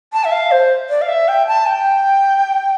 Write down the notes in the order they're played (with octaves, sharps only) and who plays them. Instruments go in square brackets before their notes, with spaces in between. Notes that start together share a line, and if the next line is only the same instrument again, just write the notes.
[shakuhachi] A5
E5
F5
C5
D5
F5
E5
G5
A5
G5